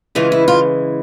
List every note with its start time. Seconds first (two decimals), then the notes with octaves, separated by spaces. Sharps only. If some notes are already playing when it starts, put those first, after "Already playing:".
0.15 C#3 E3 G#3 F4
0.32 E4
0.48 F4